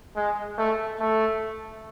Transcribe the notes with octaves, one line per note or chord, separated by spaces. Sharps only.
G#3
A3
A3